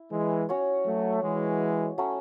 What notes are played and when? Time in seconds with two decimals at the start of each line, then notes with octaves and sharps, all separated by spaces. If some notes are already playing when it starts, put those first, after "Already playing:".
Already playing: E4
0.12 E3 G#3
0.49 C#4 F#4 C#5
0.86 F#3 A3
1.23 E3 G#3
1.98 F#3 A3 C#4